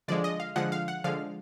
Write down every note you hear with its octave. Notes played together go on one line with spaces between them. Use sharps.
D3 F3 G#3 D5
D#5
F5
D3 F3 G#3 F#5
F5
F#5
D3 F3 G#3 F5